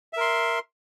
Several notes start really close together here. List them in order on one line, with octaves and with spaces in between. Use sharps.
E5 A#4 C6